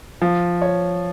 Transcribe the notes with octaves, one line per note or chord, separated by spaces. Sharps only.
F3
C#5